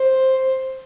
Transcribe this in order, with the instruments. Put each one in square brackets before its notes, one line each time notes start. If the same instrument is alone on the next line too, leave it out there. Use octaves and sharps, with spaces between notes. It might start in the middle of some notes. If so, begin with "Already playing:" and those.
Already playing: [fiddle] C5